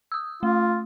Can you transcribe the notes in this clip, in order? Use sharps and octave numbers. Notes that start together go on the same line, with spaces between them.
D#6 E6
A3 F4